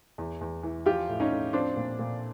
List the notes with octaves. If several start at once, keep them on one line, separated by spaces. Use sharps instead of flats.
E2
E2
E3
F3 F4 G4
A2
C#4 D#4
A2
F3 C4 D4
A#2
A#2